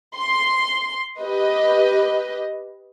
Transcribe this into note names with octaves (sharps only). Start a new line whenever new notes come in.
C6
G4 B4 D#5